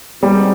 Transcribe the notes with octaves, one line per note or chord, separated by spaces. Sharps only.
B2 G3 G#3 C4 D#4